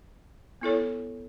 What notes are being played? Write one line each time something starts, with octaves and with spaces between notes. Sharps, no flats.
B3 E4 A4 C#5